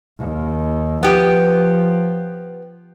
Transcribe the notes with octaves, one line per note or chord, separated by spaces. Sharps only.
D#2
F3 B3 G4